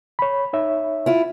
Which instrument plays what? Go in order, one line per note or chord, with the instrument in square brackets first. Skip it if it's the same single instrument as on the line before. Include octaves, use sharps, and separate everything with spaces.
[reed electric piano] C#5 B5
D#4 C#5 E5
[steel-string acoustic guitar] E4 F4